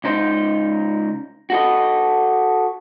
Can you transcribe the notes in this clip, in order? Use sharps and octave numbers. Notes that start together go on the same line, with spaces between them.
C#2 D#4 C5
F#4 A4 D#5